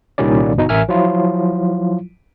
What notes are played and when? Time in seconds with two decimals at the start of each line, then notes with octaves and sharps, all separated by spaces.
0.18 C2 A#2 D#3 G3 C#4 D5
0.57 G1 B2 D#4
0.69 A1 A#4 E5 G#5 F6
0.89 F3 F#3 E4 F4